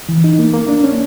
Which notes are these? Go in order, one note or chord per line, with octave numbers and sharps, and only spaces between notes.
E3
D#4
A#3
A#3
D4
C#4